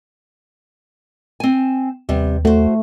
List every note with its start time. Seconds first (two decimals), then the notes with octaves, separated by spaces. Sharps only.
1.40 C4 G#5
2.09 D#2 C3 G3 B3
2.45 A3 F#4 C5